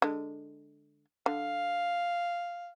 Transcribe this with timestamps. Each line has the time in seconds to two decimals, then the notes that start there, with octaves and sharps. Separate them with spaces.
0.02 D3 G#3
1.26 D3 F5